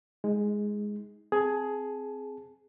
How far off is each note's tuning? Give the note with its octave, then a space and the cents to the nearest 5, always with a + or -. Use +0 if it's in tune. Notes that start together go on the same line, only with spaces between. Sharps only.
G#3 +0 D#4 +30
C4 +0 G#4 +10 A5 +0